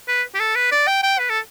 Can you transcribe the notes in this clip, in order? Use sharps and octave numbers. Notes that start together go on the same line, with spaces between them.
B4
G4
A4
B4
D5
G5
G5
B4
A4